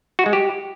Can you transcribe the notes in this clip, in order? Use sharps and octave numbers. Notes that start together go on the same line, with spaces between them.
F#4
G#3
G4